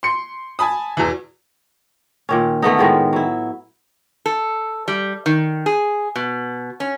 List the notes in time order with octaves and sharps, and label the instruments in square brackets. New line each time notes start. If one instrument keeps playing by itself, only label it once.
[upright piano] C6 C#7
G#5 A5 B5 D#6
E2 B2 E3
[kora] A#2 D#3 C#4
D3 A3 B3 D#4
A2 D#3 G#3 F4
F#3 E4
[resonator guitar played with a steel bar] A4
G3
D#3
G#4
B2
C#4